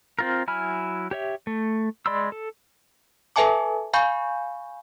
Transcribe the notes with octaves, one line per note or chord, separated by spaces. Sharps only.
C4 F4 A#4
F#3 E4 G#5 B5 F6
G4 C#5 E5
A3
G#3 D5 B5 C6 E6
A4
A4 B4 E5 G#5 A5 D6
F5 G#5 B5 C#6 G6